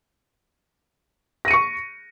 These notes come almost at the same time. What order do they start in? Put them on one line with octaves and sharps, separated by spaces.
A#6 D#7 C#7 C#6